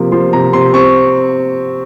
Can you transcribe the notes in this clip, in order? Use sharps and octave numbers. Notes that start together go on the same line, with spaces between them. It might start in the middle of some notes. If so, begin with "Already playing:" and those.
Already playing: C3 F3 A#3
F3 C6
C3 A#5
C3 C6
C4 C#6